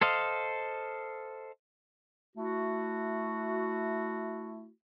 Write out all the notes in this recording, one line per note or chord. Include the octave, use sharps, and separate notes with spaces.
A4 C5 D#5 F5
A3 E4 F#4